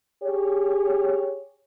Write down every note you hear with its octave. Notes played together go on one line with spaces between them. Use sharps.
G4 G#4 C#5